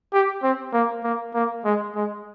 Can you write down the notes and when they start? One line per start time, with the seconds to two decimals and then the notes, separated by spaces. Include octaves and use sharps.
0.13 G4
0.43 C4
0.73 A#3
1.04 A#3
1.34 A#3
1.64 G#3
1.95 G#3